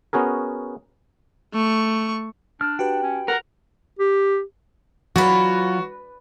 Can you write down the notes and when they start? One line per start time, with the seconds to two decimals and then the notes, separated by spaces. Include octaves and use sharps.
0.13 B3 C#4 F#4 G#4 A#4
1.54 A3 C#6
2.61 D4 F6
2.79 F#4 G4 B4 G5
3.03 C#4
3.28 A#4 F#5
3.99 G4
5.16 F#3 F4 F#4 B4 D5